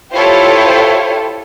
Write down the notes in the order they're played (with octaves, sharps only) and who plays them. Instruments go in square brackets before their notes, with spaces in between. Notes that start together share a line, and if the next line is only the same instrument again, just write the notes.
[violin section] E4 F4 G4 A4 C5 C#5